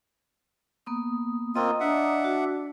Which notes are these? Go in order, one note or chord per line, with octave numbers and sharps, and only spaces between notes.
A#3 B3 D#6
A#3 C4 F4 D#5 A#5 D#6
D4 E5 F#5
F#4